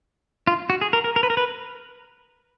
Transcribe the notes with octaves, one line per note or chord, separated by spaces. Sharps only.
F4
F#4
G#4
A#4
A#4
A#4
B4
A#4
B4